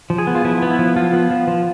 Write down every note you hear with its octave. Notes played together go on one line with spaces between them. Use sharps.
F3
G#4
B3
F4
F3 E4
B3
E4
F3
F3 F4
B3
F3
F3